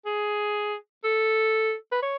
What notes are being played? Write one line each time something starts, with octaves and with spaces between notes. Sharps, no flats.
G#4
A4
B4
C#5